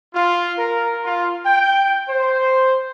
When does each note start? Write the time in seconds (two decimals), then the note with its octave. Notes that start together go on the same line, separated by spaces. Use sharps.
0.14 F4
0.57 A#4
1.04 F4
1.45 G5
2.09 C5